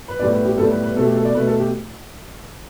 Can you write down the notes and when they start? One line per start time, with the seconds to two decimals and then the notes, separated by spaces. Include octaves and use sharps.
0.08 B4
0.19 A2 G3 B3 D5
0.32 B4
0.45 G4
0.58 A2 G3 B3 A4
0.71 B4
0.83 B4
0.96 B2 A4
0.99 A3
1.06 G4
1.15 A4
1.25 D5
1.34 B2 A3 B4
1.47 A4
1.60 G4